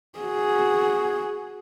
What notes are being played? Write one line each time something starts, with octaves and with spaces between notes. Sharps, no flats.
F#4 G#4